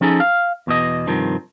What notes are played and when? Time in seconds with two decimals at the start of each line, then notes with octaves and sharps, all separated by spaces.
0.01 F3 C#4 D#4 G#4 A4
0.20 F5
0.67 E2 B2 D#5
1.07 G2 C3 D#3 F3